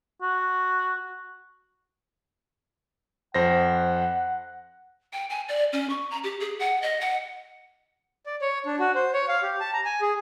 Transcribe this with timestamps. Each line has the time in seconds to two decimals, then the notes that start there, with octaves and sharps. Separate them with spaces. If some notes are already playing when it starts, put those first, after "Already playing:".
0.22 F#4
3.34 F2 C5 F#5 A#6
5.13 G5
5.30 G#5
5.49 D5
5.73 C#4
5.90 C#6
6.11 A#5
6.24 G4
6.40 G#4
6.59 F#5
6.82 D#5
7.01 F#5
8.26 D5
8.42 C#5
8.66 D4
8.79 F#4
8.95 C5
9.13 C#5
9.28 F5
9.43 G4
9.60 A5
9.73 A#5
9.85 G#5
10.01 G#4